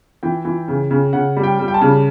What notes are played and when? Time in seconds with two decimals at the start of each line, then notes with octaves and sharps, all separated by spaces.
0.23 E3 G5
0.45 E3
0.68 C#3
0.91 C#3
1.13 C#3 F#5
1.37 G3
1.44 G5
1.59 G3
1.68 G5
1.74 A5
1.81 C#3